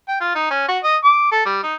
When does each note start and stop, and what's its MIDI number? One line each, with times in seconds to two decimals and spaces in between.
0.08 0.16 79
0.20 0.31 65
0.35 0.49 63
0.50 0.63 61
0.68 0.78 66
0.84 0.96 75
1.04 1.29 86
1.32 1.44 69
1.46 1.62 55
1.63 1.75 63